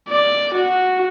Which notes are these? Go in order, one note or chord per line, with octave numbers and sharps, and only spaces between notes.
D5
F#4